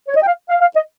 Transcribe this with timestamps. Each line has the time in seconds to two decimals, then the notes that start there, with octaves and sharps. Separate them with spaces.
0.08 C#5
0.15 D#5
0.22 G5
0.27 F5
0.49 F5
0.61 F5
0.76 D#5